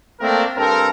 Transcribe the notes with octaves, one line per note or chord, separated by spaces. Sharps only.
A3 A#3 C4 D4 A#4
G2 C4 A4 A#4